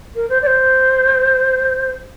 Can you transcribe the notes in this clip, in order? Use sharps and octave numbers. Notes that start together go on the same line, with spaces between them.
A#4
C5
D5
C5